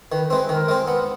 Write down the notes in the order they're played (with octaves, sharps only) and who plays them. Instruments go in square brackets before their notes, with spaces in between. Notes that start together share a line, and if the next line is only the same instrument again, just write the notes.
[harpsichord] D#3 [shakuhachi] B4
[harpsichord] G#3 C4 [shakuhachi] B4
[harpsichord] D#3 [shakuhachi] A#4
[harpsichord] G#3 C4
B3